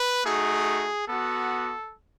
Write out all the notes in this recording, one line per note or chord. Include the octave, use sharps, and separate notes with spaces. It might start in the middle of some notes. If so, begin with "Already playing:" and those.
Already playing: B4
A3 D#4 F#4 G#4
B3 F#4 A4